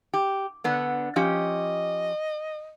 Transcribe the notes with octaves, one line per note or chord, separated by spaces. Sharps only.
G4
D3 B3 D4
F3 C#4 G4 D#5